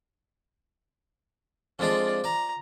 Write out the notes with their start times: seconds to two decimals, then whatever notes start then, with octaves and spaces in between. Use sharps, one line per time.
1.79 F2 G#3 D4 F4 D5
2.24 D5 A#5